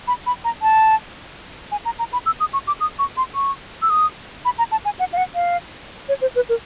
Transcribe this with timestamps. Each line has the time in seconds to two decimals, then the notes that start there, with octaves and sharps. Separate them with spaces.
0.08 B5
0.26 B5
0.44 A#5
0.62 A5
1.72 G#5
1.85 A#5
1.99 A#5
2.13 B5
2.26 E6
2.40 D#6
2.53 C#6
2.67 D6
2.80 D#6
2.99 C#6
3.17 C6
3.35 C#6
3.82 E6
3.90 D#6
4.45 B5
4.58 A#5
4.72 A5
4.85 G#5
4.99 F#5
5.13 F5
5.17 F#5
5.35 F5
6.09 C#5
6.21 C5
6.36 B4
6.49 A#4